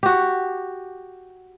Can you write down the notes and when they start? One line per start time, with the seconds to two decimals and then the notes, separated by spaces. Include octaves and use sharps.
0.03 F#4 G4